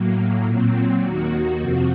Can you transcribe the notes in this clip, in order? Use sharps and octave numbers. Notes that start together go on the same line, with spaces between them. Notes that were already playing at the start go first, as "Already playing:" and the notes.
Already playing: A2 F#3 A#3
A#2 F#3 C4
D#2 D#3 A#3 F#4
F2 C3 F3 C4 F#4